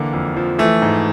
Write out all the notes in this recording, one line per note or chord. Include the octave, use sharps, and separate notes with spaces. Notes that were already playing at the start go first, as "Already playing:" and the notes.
Already playing: D3 E3 A#3
F2
F3
E3 A3
G#2